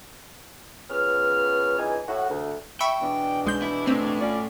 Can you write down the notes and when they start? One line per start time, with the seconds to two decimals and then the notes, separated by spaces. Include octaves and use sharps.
0.90 C#2 B3 C#4 F6
1.79 C#2 E3 D#4 G#5
2.08 A2 F#4
2.30 D2
2.81 E5 G5 B5 C#6
3.01 E2 B2 D4
3.45 B1 G#3 G6
3.62 E4
3.87 A2 C4
4.21 C#4 F4 D5